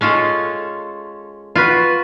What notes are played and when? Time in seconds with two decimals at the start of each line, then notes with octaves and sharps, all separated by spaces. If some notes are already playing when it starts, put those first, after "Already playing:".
0.01 G#3 C#4 F4 A4
1.55 F4 F#4 B4